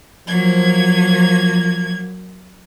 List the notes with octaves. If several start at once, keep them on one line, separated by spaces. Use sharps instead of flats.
F3 F#3 A#3 G#6